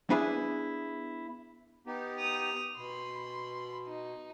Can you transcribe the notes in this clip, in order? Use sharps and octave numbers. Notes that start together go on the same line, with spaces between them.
B3 D4 E4 G#4 B4
B3 D#4 G4
D#6 F7
B2 B5 C6
D#4